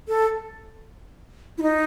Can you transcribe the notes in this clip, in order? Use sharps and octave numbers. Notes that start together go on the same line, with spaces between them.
A4
E4
D#4